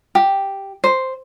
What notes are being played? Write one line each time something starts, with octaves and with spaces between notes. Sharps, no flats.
G4
C5